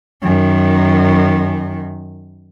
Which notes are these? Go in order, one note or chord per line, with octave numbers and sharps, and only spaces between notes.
F#2 D#3